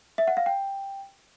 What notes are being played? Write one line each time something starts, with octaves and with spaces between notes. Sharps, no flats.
E5
F#5
F5
G5